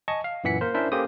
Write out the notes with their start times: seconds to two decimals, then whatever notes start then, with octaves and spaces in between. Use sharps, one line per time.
0.08 D#5 G#5 A5 C#6
0.24 F5
0.44 F#2 A#2 E3 F#5 B6 C#7
0.61 A#3 A#4 C5
0.74 C#4 D4 E4 A#4 C5 E5
0.92 A#3 C#4 G4 A4 C5 D#6